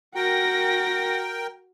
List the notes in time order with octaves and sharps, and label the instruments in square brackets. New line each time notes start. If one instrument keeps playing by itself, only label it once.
[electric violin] F#4 A#6 [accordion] A#4 G5